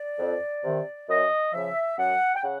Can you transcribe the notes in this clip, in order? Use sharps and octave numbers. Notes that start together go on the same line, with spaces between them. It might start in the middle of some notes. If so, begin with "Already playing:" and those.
Already playing: D5
F2
C3 D#3
F#2 D#5
C#3 F3 E5
F#2 F#5
G5
C#3 F#5